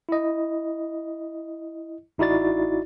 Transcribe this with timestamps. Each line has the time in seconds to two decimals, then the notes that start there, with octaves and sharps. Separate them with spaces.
0.09 E4 D#5
2.18 A1 D#4 E4 F#4 D5 A6